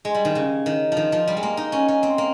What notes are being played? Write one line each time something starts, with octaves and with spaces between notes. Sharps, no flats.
G#3
G3
D#3
C#3
D#3
D#3 F3
F3
G3
G#3
A#3
D#4
C#4
C#4
C4
A#3